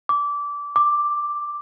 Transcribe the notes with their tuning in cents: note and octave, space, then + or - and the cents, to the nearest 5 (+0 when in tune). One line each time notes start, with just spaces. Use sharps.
D6 -20
D6 +5